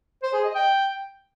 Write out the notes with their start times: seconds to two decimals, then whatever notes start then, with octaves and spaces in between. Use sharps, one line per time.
0.23 C5
0.34 G#4
0.44 D#5
0.55 G5